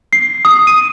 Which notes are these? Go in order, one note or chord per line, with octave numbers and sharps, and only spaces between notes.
C7
D#6
D#7